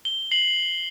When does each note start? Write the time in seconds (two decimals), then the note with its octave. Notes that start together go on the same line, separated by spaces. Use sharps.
0.05 G7
0.31 C7 F#7